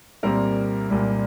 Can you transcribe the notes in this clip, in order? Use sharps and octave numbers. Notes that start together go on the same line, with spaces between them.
C2 A#2 G3 A#3 C4 A#4
C2 A#2 G3 C4